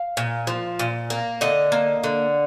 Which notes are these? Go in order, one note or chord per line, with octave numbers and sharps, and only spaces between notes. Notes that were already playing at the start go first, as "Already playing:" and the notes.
Already playing: F5
A#2
F3
A#2
A#3
D3 D#5
A#3
D3